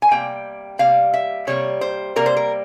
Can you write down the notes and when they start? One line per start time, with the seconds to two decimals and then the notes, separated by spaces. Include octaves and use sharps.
0.02 G#5
0.11 C3 G3 A#3 G5
0.79 C3 G3 A#3 F5
1.14 E5
1.47 C3 G3 A#3 C#5
1.81 C5
2.16 C3 G3 A#3 A#4
2.26 C5
2.37 A#4